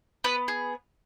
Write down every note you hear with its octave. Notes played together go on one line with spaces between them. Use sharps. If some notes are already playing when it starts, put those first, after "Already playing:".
B3 B4
G#4